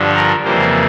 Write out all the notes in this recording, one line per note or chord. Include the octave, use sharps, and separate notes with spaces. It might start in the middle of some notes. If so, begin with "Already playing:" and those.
Already playing: G2 D3 F3
A#4
F2 C#3 E3 G3 A#3 C5